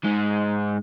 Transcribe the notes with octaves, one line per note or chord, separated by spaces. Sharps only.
G#2 G#3